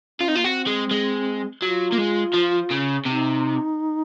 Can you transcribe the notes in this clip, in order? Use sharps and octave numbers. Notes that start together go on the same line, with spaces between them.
C#4 F4
C4 D#4
A#3 F4
C4 F#4
G#3
G#3
F#3 F4
A#3
G#3
F3
C#3
C3 D#4